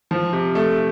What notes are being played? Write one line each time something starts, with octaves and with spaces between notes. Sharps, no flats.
F3
C3
A3